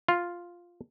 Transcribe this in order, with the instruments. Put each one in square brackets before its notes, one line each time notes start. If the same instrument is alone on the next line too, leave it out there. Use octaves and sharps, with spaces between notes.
[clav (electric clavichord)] F4